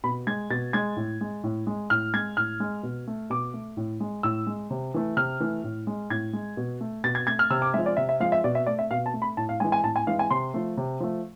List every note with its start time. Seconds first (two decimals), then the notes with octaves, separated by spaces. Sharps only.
0.04 B2 B5
0.27 G#3 G#6
0.50 B2 A6
0.73 G#3 G#6
0.96 A2
1.21 G#3
1.44 A2
1.67 G#3
1.90 A2 F6
2.14 G#3 G#6
2.37 A2 F6
2.60 G#3
2.83 B2
3.07 A3
3.30 B2 D6
3.54 A3
3.77 A2
4.00 G#3
4.23 A2 E6
4.47 G#3
4.70 C3
4.94 E3 A3
5.17 C3 F6
5.40 E3 A3
5.64 A2
5.87 G#3
6.10 A2 G#6
6.33 G#3
6.57 B2
6.81 A3
7.04 B2 A6
7.15 G#6
7.27 A3 G#6
7.39 F6
7.50 C3 E6
7.62 D6
7.74 G#3 E5
7.78 F3
7.86 D5
7.97 C3 E5
8.09 E5
8.20 F3 G#3 F5
8.32 E5
8.44 B2 D5
8.55 E5
8.66 A3 D5
8.79 E5
8.91 B2 F5
9.06 A5
9.14 A3
9.22 B5
9.37 A2 A5
9.49 F5
9.60 E3 G#3 G#5
9.72 G#5
9.84 A2 A5
9.96 G#5
10.07 E3 G#3 F5
10.19 G#5
10.31 C3 C6
10.54 F3 A3
10.77 C3
11.00 F3 A3